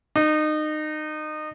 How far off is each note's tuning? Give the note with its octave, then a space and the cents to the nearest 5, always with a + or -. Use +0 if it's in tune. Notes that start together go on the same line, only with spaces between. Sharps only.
D#4 -25